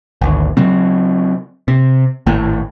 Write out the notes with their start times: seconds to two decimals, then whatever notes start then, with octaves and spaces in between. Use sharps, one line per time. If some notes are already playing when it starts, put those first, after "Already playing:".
0.21 G#1 D2
0.57 C#3 F#3 C4
1.68 C3
2.26 G#1 A2